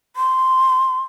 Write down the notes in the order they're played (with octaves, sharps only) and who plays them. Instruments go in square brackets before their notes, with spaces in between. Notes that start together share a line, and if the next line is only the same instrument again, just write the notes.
[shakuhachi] C6